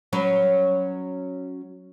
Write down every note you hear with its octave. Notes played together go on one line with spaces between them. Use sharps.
F#3 C#4 B4